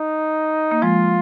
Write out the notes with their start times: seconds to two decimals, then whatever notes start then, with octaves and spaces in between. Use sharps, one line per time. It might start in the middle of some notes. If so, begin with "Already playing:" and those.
Already playing: D#4
0.71 A#3
0.82 F3 G#3 F4